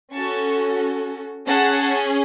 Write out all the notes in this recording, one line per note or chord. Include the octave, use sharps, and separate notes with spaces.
C#4 F#4 A4 A5 C#6
C#4 G#4 F#5 A5